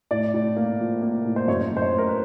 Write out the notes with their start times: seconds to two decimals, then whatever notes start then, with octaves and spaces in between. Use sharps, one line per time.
0.11 A2 D5
0.34 A2
0.56 A#3
0.80 F3
1.02 A#3
1.25 A2
1.36 C5
1.48 F#2 C#5
1.72 F#2 C5
1.82 C#5
1.93 A3 A#4
2.08 B4